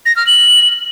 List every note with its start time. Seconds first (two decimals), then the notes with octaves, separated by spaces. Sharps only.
0.06 A#6
0.16 F6
0.27 F#7